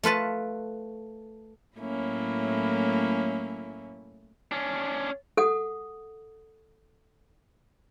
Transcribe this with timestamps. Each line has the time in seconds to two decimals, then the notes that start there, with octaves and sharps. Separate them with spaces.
0.03 A3 F4 B4 A5
1.77 A2 F#3 A3 A#3 C#4 E4
4.52 C#4 D4
5.37 A4 F#5 D#6